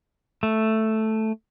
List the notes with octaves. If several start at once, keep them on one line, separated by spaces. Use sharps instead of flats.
A3